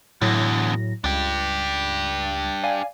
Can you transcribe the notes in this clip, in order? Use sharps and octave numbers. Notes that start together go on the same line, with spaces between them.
E2 A2 D3 F#3 A#6
C#2 D4 G4
D5 F5 G#5